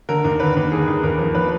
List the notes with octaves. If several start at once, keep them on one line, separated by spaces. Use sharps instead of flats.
D3 A#4
D#2
D3 B4
D#2
D3 G#4
D#2
D#2 A#4
F3
F3 B4